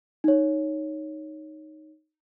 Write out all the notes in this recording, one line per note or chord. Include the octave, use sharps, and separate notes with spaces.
D#4 C#5